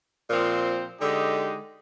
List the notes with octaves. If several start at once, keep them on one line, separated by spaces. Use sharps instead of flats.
A#2 F3 C4
D3 G#3 D#4 G4